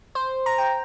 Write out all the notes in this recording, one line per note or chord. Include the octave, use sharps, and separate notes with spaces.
C5
A#5
G5